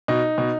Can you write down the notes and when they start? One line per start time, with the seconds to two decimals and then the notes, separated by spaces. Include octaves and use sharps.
0.08 B2 D#4
0.38 B2